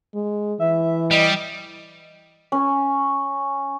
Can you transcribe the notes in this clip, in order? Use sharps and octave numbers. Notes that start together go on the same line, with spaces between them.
G#3
E3 E5
G3 D#5
C#4